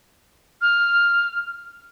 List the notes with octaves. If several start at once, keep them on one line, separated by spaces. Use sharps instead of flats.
F6